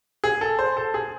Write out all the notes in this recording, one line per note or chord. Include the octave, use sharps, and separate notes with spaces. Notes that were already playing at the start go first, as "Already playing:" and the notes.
G#4
A4
C5
A4
G#4